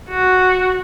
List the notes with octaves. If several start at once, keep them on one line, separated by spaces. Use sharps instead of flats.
F#4